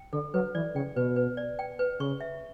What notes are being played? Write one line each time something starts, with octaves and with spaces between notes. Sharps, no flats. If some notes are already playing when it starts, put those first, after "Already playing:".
Already playing: G5
D3 A4
F#3 B4
E3 D5
C#3 G5
B2 B4
B4
D5
G5
B4
C#3 C#6
E5